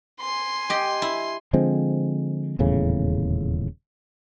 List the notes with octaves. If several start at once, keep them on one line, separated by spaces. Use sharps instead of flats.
G#5 C6
G4 D#5
E4
D3 F3 G#3 C4
D#1 E2 A2 C#3